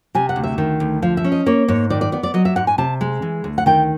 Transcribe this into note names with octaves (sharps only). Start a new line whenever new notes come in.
C3 G#5
F#5
D2
E5
D#3
D2
F3 F5
E5
C#4
D#5
A#3 C#5
G#2 C#5
D#3 D5
D5
B3 D5
D5
F#3 D#5
E5
G#2 F#5
G#5
C3 A5
G#3
E3
D2
F#5
D#3 G5